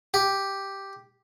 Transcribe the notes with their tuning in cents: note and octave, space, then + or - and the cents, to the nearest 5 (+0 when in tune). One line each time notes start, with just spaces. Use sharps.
G4 +0